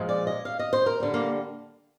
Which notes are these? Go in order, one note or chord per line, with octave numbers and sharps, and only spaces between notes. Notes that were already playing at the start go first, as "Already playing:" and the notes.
Already playing: A#2 F3 G#3
D5
D#5
F5
D#5
C5
A#4
D3 G3
A#3